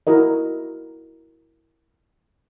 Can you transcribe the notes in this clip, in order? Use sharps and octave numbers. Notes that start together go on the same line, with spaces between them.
E4 F#4 A#4 D#5